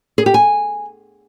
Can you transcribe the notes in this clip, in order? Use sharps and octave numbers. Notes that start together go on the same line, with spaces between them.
G#4
G4
G#5